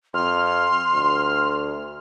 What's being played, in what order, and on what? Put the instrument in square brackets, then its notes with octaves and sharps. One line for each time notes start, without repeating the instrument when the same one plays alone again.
[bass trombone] F2 [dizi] C6 [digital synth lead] F6
[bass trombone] D2